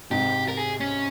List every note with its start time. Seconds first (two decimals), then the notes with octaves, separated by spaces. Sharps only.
0.11 G#2 C3 G4
0.48 A#4
0.57 G#4
0.80 C#4